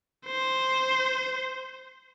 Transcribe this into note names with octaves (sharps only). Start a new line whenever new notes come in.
C5